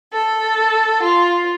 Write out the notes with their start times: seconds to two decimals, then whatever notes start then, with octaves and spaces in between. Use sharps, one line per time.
0.12 A4
1.03 F4